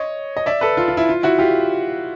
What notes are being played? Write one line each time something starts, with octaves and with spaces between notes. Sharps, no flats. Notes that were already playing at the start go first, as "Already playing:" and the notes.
Already playing: C#5 D#5
D#5
D5 E5
A4 B4
F4
F4
E4
F4
E4 F#4
F4 G4